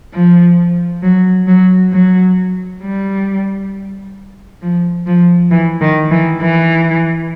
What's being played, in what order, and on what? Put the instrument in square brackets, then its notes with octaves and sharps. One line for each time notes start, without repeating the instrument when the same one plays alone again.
[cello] F3
F#3
F#3
F#3
G3
F3
F3
E3
D#3
E3
E3